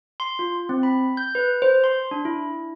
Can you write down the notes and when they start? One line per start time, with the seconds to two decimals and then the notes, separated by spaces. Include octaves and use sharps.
0.20 C6
0.39 F4
0.69 C4
0.83 B5
1.17 G6
1.35 B4
1.62 C5
1.84 C6
2.11 D4
2.25 E4